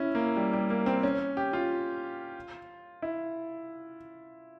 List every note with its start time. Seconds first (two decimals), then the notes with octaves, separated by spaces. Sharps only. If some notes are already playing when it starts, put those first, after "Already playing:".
Already playing: C#4 E4
0.15 A#3
0.36 G3
0.53 G3
0.70 A#3
0.86 C4
1.03 C#4
1.37 G4
1.53 F4
3.02 E4